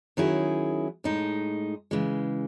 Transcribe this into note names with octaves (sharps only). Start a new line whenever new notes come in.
D#3 F#3 C#4 E4 G#4
A2 G#3 D#4
C#3 E3 G#3